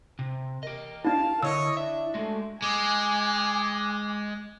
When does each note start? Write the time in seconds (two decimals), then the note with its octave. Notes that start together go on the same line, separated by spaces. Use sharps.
0.19 C3
0.63 G4 A#4 D#5
1.05 D4 E4 F5 A5
1.43 D3 E4 C#5 D#5 E6
1.77 D4 E5
2.14 G#3 A3 F#4
2.62 G#3 G#5 D6